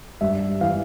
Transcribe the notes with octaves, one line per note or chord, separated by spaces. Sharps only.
G2 E5
E3 F5